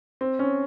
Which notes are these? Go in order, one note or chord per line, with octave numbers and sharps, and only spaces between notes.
C4
C#4